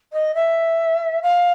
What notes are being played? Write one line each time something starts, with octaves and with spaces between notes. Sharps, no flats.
D#5
E5
F5